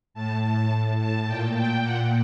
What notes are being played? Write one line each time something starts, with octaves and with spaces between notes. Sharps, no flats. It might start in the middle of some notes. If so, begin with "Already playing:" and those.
A2 A5
A2
A5
A#2 G5
G5
A#2 F#5